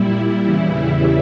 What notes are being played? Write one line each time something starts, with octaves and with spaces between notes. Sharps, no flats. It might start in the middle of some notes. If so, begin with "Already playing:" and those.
Already playing: A#2 G3 E4
E2 C#3 E3 G3